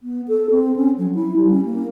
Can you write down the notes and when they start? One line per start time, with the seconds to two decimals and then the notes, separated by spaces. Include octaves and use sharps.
0.03 B3
0.28 A4
0.51 C4
0.76 C#4
0.98 F#3
1.15 E4
1.36 G3
1.51 C#4
1.65 A#3